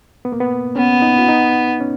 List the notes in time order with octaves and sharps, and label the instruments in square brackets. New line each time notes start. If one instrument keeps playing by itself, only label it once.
[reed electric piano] B3
A#3
B3
[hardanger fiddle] B3 [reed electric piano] C#4
[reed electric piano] D#4
F4
D#4
C#4